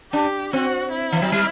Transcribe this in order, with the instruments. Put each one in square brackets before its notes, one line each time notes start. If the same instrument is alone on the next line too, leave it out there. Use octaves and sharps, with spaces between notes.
[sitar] D4 [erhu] G4
[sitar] C4 [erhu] F#4
[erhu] E4
[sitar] E3
F#3
G3